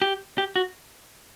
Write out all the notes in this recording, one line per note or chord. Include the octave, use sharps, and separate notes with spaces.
G4
G4
F#4